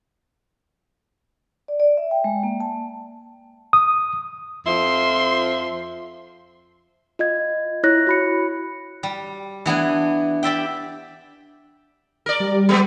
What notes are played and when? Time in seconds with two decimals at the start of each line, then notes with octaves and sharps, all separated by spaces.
1.68 D5
1.80 D5
1.97 E5
2.11 G5
2.24 G#3
2.43 A#3
2.60 A5
3.73 D#6
4.66 F2 F3 E5 C6
7.19 F4 D#5 G#6
7.83 E4 C#5 F#6 A#6
8.07 F#4 B5 C#7
9.03 G3
9.66 E3 B3 D4 G#5
10.43 G4 D5 E5 G5
12.26 A#4 D5
12.40 G3
12.69 G#3 B3 G4